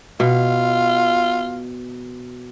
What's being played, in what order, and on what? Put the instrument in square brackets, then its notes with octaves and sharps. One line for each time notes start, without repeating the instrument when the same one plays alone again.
[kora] B2 [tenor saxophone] F4